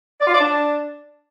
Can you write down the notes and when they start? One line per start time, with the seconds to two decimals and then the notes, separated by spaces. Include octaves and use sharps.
0.21 D5
0.27 F4
0.34 D5
0.40 D4